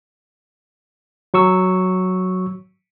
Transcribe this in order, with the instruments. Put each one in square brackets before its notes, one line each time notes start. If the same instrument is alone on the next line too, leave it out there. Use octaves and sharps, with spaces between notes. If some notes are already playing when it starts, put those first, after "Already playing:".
[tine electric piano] F#3 C#6 E6